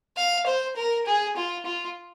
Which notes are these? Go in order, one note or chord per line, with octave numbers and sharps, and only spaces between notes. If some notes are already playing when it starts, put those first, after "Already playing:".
F5
C5
A#4
G#4
F4
F4